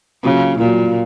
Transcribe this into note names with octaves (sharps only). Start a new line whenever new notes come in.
C#3 F#3 A#3 F4
A#2 F#3 A#3 F4